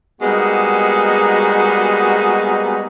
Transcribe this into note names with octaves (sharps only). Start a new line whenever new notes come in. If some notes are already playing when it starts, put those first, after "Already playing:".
G3 G#3 A#3 B3 D#4 F#4